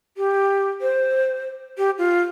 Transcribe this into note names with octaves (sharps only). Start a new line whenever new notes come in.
G4
C5
G4
F4